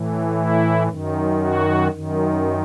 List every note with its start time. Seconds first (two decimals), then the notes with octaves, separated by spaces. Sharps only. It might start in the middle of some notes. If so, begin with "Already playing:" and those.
Already playing: A2 E3
0.36 E4
0.89 F#2 D#3
1.41 F#4
1.92 F#2 D#3